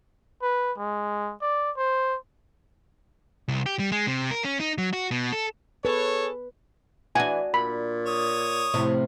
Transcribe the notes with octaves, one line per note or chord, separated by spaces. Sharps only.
B4
G#3
D5
C5
C2
G4
G3
G#3
C3
A#4
C#4
D#4
F#3
F#4
B2
A4
G#4 A4 B4 C#5
E3 D4 F#4 G#5
A#2 B5
C#5 D#6
A2 C3 F3